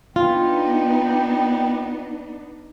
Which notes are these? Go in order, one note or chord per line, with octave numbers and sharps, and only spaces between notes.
B3 D4 D#4 F4 G5